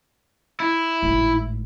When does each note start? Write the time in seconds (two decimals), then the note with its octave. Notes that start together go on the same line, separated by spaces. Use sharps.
0.60 E4
1.03 G#1 A2